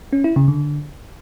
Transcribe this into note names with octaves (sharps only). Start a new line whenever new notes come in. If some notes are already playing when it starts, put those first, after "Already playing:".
C#4
E4
C#3
D3